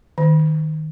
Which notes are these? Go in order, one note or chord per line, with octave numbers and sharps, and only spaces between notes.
D#3